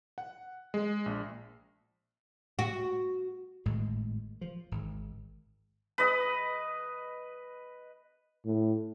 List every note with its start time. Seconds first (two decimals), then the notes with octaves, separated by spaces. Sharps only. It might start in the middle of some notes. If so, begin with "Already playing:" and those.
0.18 F#5
0.74 G#3
1.06 A#1
2.59 F#4
3.66 G#1 A2 G#3
4.41 F3
4.72 G#1
5.98 B4 D#5
8.45 A2